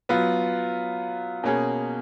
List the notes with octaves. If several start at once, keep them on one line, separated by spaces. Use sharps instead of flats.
F#3 B3 F4
B2 A#3 C#4 G#4